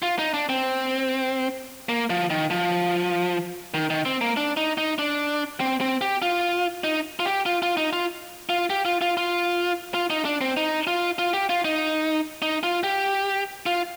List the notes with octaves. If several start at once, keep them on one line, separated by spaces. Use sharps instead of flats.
F4
D#4
D4
C4
A#3
F3
D#3
F3
D#3
D#3
C4
A#3
D4
D#4
D#4
D4
C4
C4
G4
F4
D#4
F4
G4
F4
F4
D#4
F4
F4
G4
F4
F4
F4
F4
D#4
D4
C4
D#4
F4
F4
G4
F4
D#4
D#4
F4
G4
F4